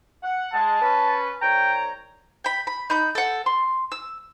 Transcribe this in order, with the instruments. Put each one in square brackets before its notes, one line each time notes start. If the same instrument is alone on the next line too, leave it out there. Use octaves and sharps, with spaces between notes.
[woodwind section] F#5
[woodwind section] G#3 [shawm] A5
[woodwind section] C#4 B4
[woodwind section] C2 C#5 A#5 [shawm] G5
[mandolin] G5 B5
B5
D#4 B5 G6
A4 F#5
C6
E6